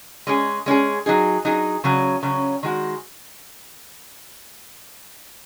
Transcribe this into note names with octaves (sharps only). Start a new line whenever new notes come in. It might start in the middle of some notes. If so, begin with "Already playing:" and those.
G#3 C#4 G#4
G#3 C#4 G#4
F#3 D#4 G#4
F#3 D#4 G#4
C#3 F#3 C#4
C#3 F#3 C#4
D#3 G#3 F#4